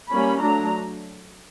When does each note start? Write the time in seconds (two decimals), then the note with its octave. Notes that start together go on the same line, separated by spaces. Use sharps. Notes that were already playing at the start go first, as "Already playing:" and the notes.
0.10 G3 A#3 C#4 B5
0.41 F#3 A3 D4 A#5